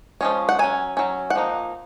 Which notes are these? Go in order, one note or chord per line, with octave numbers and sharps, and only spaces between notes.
F3 G#3 C#4
F#5
F#3 C#4 G#5
F#3 C#4
F#5
F3 A#3 D#4